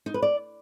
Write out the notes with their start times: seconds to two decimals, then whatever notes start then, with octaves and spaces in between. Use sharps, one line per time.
0.06 D#4
0.14 B4
0.22 D5